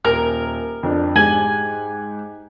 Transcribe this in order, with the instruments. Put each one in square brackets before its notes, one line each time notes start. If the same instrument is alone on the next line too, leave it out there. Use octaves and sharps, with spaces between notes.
[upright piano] D#1 [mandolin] A#4
[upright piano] F2 D4
[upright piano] G#2 G4 F#7 [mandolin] G#5